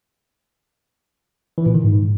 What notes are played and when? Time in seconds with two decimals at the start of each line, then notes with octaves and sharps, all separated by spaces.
1.58 E3
1.66 A#2
1.74 D#3
1.83 G#2